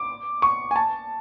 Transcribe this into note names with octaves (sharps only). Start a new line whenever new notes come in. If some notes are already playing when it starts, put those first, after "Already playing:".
Already playing: D6
C#6
G#5
A5